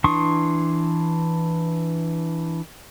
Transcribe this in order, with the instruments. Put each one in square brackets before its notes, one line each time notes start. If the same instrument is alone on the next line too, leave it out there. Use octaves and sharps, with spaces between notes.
[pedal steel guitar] E3 D4 C6 C#6 D#6